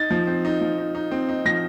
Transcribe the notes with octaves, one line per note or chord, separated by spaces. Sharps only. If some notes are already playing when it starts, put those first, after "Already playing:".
Already playing: D#4 A6
F3
C4
D#4
F3
D#4
D#4
C4
D#4
F3 A#6